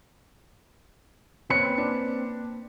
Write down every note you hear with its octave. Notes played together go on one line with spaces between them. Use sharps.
A#3 C4 C#4 B4 C#7
D4